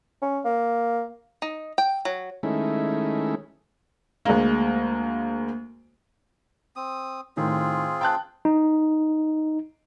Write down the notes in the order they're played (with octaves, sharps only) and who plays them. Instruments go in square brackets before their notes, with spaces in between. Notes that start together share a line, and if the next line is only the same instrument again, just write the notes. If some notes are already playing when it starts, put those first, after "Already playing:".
[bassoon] C#4
A#3
[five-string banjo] D#4
G5
F#3
[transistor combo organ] D#3 G#3 A3 C#4 E4
[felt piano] D2 G#3 A#3
[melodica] C4 D#6
[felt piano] A2 D#3 [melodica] C4 F4 G#4
[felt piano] G5 A5 F#6
[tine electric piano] D#4